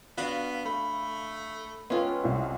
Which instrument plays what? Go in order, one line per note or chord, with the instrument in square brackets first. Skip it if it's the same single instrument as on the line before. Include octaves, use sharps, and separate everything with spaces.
[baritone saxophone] B3 [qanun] D4 F#4 [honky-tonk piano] F5
[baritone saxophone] A3 [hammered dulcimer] B5
[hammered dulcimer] G#3 A4 G5 [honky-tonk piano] B3 [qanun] C#4 F4
[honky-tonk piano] C2